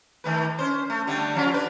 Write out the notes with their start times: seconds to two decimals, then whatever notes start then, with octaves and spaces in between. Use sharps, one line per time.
0.24 D#3 A3 B4
0.59 C#4 C5
0.90 A3
1.07 D3 G3 A3
1.35 F3 C#4 F4
1.51 D4 B4